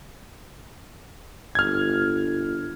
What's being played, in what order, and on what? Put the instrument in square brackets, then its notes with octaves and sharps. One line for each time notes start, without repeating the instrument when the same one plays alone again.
[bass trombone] G1 [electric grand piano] F6 G#6